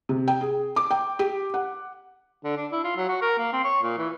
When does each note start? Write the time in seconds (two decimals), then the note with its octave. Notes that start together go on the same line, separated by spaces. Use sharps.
0.09 C3
0.28 G5
0.41 G#4
0.76 D6
0.91 G5
1.19 G4
1.54 F#5
2.44 D3
2.57 D4
2.72 E4
2.84 F4
2.97 F#3
3.08 F#4
3.22 A#4
3.38 A#3
3.53 C4
3.64 C#5
3.83 A#2
3.98 E3